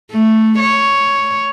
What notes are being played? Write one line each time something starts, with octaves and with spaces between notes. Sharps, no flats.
A3
C#5